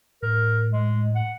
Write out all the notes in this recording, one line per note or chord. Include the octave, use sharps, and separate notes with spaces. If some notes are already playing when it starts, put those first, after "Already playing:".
A2 A#4
G#3
F#5